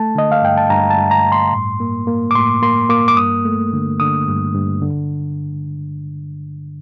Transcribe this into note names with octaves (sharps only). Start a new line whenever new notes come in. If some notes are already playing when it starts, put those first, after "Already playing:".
Already playing: A3 A5
D3 D#5
F5
G2 G5
A5
G2 A#5
A5
G2
A#5
G2
C6
A2
A#3
A#3
D6
A2 C6
A#3 C6
A#3 D6
D6
G2 D#6
A3
D3
D3 D#6
G2
G2
D3